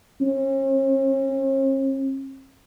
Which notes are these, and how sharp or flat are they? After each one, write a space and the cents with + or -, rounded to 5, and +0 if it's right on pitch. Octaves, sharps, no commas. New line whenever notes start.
C#4 -45